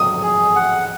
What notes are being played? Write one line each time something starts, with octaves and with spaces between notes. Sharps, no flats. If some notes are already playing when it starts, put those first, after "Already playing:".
Already playing: D#6
G#4
F#5